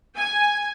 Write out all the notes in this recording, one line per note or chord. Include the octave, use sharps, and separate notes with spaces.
G#5